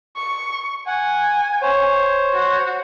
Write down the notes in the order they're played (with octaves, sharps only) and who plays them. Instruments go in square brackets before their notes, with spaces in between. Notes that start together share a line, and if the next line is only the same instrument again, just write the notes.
[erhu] C#6
[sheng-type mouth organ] F#5 [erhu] G#5
[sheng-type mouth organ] C5 C#5
[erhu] F#4